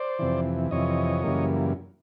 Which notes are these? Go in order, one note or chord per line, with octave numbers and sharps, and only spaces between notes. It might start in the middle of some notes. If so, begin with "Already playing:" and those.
Already playing: C5 D5
F2 C3 E3
F2 C3 E3 C#5 D#5
F#2 C#3 E3 G3 A#3